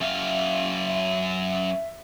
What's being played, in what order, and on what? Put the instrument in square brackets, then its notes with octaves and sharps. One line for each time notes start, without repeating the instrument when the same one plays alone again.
[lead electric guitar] F#2 F5 [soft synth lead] E5